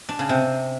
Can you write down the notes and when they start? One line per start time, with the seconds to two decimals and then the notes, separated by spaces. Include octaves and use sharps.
0.09 D4
0.19 C#3
0.29 C3